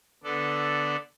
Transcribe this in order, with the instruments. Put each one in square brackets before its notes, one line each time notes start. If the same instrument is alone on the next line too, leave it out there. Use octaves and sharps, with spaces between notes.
[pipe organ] D3 B3 A4 D5